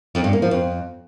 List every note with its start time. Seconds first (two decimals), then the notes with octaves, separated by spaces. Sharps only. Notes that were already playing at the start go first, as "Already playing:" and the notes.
0.15 F2
0.24 G2
0.33 A#3
0.42 F3
0.51 F2